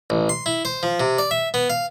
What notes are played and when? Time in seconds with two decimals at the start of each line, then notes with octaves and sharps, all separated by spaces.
0.10 A1
0.29 C6
0.46 E4
0.65 C5
0.83 F3
1.00 C3
1.18 D5
1.31 E5
1.54 B3
1.70 F5